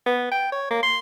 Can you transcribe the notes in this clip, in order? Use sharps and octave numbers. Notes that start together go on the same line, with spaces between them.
B3
G5
C#5
A#3
C6